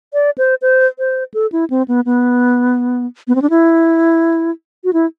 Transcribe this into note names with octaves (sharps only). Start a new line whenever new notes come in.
D5
C5
C5
C5
A4
E4
C4
B3
B3
B3
C4
D4
E4
F#4
E4